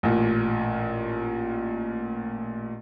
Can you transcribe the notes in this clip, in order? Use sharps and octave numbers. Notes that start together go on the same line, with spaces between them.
A1 A#2